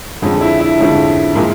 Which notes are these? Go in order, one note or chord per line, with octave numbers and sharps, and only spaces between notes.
F2 D3 F3 G#3 C#4
E4
E4
F2 D3 F3 G#3 C#4
A#2 F3 G#3